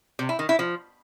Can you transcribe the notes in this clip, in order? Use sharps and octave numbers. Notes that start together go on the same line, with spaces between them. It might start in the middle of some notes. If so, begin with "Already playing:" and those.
C3
E4
D#3
E4
F3